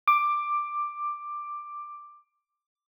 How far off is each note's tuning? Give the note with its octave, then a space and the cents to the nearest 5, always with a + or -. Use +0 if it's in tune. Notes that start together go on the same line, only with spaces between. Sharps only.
D6 +10